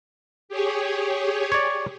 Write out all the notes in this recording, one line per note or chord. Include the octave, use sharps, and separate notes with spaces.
G4 G#4 C#5
C#5 D5